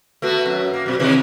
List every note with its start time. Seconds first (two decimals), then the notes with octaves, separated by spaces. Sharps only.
0.22 A3 B3 F#4
0.46 F#2
0.74 A#3
0.86 F#2 B2
1.00 C3 D#3 E3